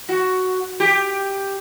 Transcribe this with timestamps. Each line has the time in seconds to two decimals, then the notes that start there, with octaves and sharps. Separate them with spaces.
0.09 F#4
0.80 G4